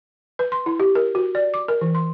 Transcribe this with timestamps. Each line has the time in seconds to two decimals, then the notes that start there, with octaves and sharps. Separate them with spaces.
0.39 B4
0.52 C6
0.66 E4
0.80 G4
0.95 A#4
1.15 F#4
1.35 D5
1.54 D6
1.68 A#4
1.81 E3
1.95 C6